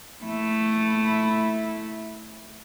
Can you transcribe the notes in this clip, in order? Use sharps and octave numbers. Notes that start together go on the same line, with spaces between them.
A3 E4